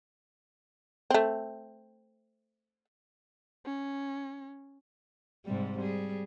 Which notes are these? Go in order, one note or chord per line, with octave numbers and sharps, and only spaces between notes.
A3 C4
C#4
G#2 C3 G3
G3 G#4